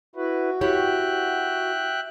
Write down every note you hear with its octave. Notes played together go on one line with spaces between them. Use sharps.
E4 F#4 B4
E4 G4 C#5 E5 G5 F#6